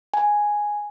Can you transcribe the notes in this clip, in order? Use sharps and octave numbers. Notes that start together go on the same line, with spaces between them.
G#5